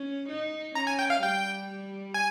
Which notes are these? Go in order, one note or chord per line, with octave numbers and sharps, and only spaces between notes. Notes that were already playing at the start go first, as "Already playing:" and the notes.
Already playing: C#4
D#4
C#4 A#5
G#5
G5
F5
G3 G5
G#5